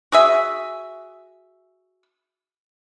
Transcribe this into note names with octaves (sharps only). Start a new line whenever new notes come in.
F#4 G#4 E5